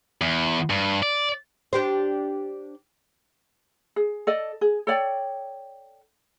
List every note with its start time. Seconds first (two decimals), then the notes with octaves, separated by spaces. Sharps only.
0.21 E2
0.70 G2
1.03 D5
1.73 D4 G4 C5
3.96 G#4
4.27 A4 D5 D#5
4.61 G#4
4.87 A4 C#5 D5 G5